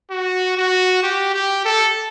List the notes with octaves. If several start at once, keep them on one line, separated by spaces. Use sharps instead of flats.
F#4
F#4
G4
G4
A4